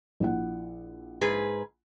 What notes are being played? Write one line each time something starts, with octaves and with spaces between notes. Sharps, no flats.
A#1 E4 F#5
G#2 G#4 B4